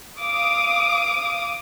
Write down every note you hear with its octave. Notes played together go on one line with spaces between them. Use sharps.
F5 D6 D#6